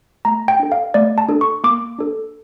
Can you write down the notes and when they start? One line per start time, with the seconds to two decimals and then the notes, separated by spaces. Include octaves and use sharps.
0.25 A3 A#5
0.48 G5
0.60 D4 A4
0.72 F5
0.94 A3 D5
1.18 A5
1.29 D4 A4
1.41 C#6
1.64 A#3 D6
1.99 D4 A4